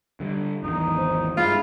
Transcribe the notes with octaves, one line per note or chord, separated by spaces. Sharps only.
D3 G3
G#1 E2 D#4
C5
G2 G#3 E4 F4